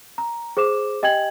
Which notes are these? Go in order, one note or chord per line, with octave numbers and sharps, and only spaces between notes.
A#5
G#4 C5 D6 E7
G4 D#5 G5 G#5 G#6 F#7